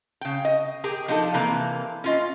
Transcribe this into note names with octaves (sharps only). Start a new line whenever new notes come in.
C#3 G5
D#5
G4 G#4 A#4 G5
F3 D4 D#4 G4 A4
C3 E3 A#3 A#5
C#4 F4 D#5